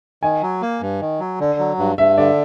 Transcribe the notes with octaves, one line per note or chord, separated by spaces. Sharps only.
D#3 G#5
F#3
A#3
G2
D#3
F#3
D3
F#3
G2
G2 E5
D3 D5